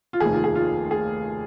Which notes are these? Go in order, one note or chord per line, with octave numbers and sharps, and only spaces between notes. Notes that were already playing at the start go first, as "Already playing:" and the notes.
F4
F1 D#2 D#3 G#4
F4
G#4
F4
G#4